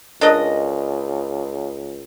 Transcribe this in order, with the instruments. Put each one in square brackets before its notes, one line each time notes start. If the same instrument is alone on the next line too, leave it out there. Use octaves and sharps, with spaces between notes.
[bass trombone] C#2 [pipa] D4 A#4 D#5